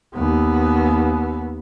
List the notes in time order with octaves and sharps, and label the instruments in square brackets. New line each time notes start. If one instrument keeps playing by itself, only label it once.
[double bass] D#2 B3